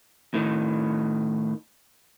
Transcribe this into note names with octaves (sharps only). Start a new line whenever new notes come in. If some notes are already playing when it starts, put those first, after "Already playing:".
A2 D#3